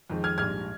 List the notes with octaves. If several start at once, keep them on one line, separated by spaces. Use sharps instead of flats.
F2 D#3 G#3
F6 G#6
A#1 G#2 G3 F6 G#6